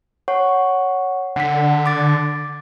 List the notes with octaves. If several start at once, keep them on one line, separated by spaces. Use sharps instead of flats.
C#5 F#5 C#6
D3 F#5 B6
D6 A6